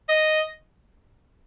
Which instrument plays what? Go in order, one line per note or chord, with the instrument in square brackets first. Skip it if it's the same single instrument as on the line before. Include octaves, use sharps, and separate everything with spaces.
[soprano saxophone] D#5